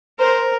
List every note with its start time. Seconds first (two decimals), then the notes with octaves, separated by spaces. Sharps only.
0.19 A#4 C5